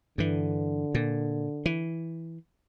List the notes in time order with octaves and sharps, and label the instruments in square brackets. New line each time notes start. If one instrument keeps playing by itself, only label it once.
[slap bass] G2 E3 [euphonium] D3
[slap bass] A#2
E3